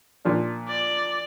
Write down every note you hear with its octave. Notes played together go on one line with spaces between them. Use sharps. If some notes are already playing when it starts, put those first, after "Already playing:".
A#2 F3 D4
D5